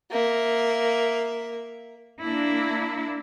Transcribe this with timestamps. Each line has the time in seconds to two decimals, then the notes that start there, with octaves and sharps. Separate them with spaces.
0.11 A#3 E5
2.22 A#3 D4 E4